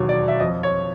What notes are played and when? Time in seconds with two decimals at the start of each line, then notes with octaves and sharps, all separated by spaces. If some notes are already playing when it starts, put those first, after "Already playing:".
Already playing: E1 D#2 F#3 C#5
0.09 D5
0.28 E5
0.40 F2 D#5
0.63 C#5